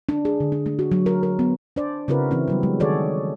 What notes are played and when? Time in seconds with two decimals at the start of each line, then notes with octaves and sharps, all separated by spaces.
0.09 D4
0.25 G#4
0.40 D3
0.52 D4
0.66 A3
0.79 F#4
0.92 F#3
1.06 A#4
1.23 A#4
1.39 B3
1.76 D4 C5 D5
2.08 C#3 C4 E4 F#4 A#4 B4
2.31 E3 C4 E4
2.48 F#3 G3 B3
2.63 F#3 G#3
2.80 D#3 F#4 G#4 A4 C#5 D5